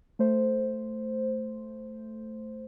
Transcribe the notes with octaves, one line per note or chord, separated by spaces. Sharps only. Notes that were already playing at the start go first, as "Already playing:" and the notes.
A3 C5